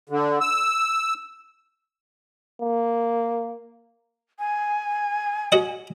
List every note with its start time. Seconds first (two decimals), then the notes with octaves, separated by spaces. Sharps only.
0.09 D3
0.41 E6
2.61 A#3
4.39 G#5
5.52 F#4 D#5 F#5